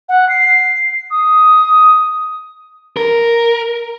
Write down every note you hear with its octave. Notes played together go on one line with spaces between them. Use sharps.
F#5
C7
D#6
A#4